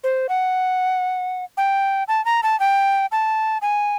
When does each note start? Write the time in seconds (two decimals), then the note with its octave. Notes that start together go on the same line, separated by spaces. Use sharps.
0.04 C5
0.29 F#5
1.57 G5
2.08 A5
2.25 A#5
2.43 A5
2.60 G5
3.12 A5
3.62 G#5